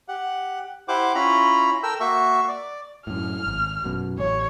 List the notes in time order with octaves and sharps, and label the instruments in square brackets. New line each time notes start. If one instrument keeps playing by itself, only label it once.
[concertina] G4 F#5
E4 G4 C5 F#5 D6
C#4 E4 F4 A#5 B5
A4 A#4 G5 E6
A#3 F#4 E5 C#6
D5
[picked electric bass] F#2 A2 [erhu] F6
[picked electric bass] G#1
F#2 B2
[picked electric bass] A1 [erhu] C#5